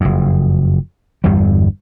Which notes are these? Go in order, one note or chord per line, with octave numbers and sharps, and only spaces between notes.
F#1 F2
G1 E2 G2 G3